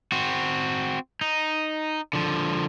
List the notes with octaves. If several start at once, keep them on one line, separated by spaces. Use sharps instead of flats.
C4 F#4
D#4
D3 F3